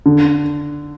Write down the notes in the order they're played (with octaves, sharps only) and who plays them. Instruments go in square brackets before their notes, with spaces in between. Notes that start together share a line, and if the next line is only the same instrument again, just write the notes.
[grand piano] D3